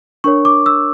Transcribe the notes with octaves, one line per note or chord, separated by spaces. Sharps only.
D4 A#4 C#5 C#6
D6
E6